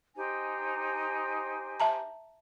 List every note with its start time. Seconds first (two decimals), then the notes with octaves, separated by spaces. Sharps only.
0.16 D#4 G4 C5 G#5
1.80 E5 A5 A#5